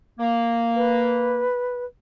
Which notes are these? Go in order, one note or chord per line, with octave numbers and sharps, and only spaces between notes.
A#3
B4